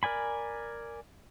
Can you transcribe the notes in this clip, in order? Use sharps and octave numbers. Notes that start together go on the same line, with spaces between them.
A#4 D5 G#5 B5